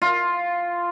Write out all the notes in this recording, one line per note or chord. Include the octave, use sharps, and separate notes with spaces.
F4